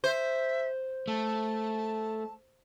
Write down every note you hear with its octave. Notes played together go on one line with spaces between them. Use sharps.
C5 E5
A3 A5